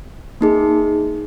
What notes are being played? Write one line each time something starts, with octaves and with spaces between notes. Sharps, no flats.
A#3 D#4 G#4